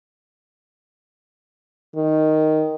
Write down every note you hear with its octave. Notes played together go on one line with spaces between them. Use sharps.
D#3